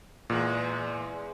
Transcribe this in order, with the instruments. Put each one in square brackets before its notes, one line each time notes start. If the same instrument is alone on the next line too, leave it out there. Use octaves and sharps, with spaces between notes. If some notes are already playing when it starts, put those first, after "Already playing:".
[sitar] E2 G#3 [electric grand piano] A#2